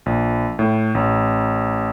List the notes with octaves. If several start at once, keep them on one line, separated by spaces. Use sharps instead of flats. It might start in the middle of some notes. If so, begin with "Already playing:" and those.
A#1
A2
A1